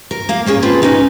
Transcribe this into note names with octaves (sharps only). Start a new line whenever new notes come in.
A#4
A#3 F5
A#3 C#4 G#4
C4 F4 G#4 A4 B4
C#4 D#4 G#4 A#4 B4